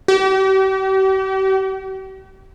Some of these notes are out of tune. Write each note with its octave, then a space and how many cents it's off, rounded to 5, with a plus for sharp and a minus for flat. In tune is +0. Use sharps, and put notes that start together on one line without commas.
G4 -40